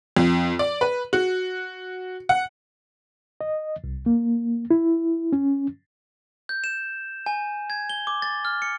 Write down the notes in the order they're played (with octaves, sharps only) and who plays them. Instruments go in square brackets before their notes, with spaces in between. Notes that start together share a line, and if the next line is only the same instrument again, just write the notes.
[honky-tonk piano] F2
D5
B4
F#4
F#5
[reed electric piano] D#5
C2
A#3
E4
C#4
[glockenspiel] G6
E7
G#5
G#6
G7
D6
A6
F6
C#7